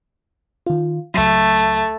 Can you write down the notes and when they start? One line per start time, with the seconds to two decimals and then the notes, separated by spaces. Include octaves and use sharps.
0.67 D#3 F4
1.14 C#2 F#3 A3